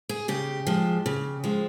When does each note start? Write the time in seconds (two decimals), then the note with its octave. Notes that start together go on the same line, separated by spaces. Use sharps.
0.09 G#4
0.28 C#3 G4
0.67 F3 G#3
1.06 C#3
1.44 F3 G#3